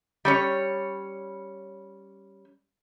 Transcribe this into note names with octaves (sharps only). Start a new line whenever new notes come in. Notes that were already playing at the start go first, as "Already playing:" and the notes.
G3 C#4 C#5